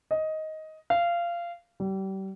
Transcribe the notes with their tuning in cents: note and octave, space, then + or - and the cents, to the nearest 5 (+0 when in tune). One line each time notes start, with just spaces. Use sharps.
D#5 +10
F5 -20
G3 -30